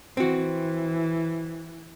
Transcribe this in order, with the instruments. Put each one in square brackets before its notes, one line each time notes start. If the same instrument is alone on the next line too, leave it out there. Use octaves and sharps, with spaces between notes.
[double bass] E3 [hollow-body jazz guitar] C4 F#4